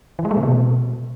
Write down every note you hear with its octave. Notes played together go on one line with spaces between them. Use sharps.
E3
G#3
A3
C3
B2